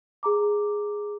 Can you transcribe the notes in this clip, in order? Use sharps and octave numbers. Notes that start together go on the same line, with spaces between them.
G#4 A#5 D6